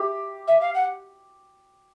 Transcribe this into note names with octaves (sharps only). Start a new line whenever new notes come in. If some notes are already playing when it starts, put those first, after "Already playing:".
Already playing: G4
E5
F5
F#5